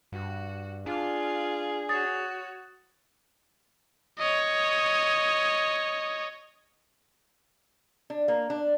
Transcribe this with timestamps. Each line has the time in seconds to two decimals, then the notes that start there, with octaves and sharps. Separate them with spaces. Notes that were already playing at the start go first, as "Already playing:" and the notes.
0.12 G2 F#4
0.86 D4 F4 G#4 F5
1.89 F#4 C#5 D#6 A6
4.18 C#5 D#5
8.10 D4
8.28 A#3
8.50 D4